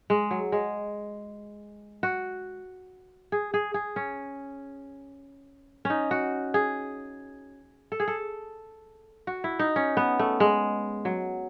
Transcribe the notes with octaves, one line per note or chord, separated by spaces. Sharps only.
G#3
F#3
G#3
F#4
G#4
G#4
G#4
C#4
C#4 D#4
F#4
G#4
A4
G#4
A4
F#4
E4
D#4
C#4
B3
A3
G#3
F#3